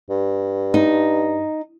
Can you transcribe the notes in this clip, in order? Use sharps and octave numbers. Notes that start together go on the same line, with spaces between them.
G2
D#4